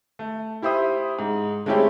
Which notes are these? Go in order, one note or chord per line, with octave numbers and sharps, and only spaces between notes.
A3
E4 G4 C5 E5 D#6
G#2
G#3 A3 C4 C#4 E4 G4